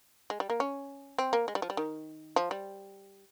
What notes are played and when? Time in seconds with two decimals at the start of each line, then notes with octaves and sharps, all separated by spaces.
0.30 G#3
0.40 G3
0.50 A#3
0.60 C#4
1.18 C4
1.33 A#3
1.48 G#3
1.55 G3
1.62 F3
1.70 G3
1.77 D#3
2.36 F3
2.51 G3